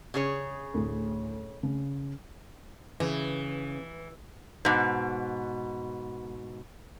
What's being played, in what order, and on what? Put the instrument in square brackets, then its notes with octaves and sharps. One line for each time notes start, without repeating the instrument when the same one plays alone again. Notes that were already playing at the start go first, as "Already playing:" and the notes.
[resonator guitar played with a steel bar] C#3 G#4 C#5
[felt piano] D2 A2
C#3
[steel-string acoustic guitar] C#3 [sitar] E3
[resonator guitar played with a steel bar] G#2 B2